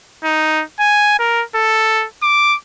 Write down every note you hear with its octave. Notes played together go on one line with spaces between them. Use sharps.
D#4
G#5
A#4
A4
D6